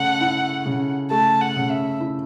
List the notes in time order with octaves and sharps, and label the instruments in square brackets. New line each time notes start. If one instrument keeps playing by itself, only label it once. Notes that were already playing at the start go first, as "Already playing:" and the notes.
Already playing: [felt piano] C#3 A3 [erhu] F#5
[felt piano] E4
C#3
[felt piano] A3 [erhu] A5
[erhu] F#5
[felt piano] C#3
[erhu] E5
[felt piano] E4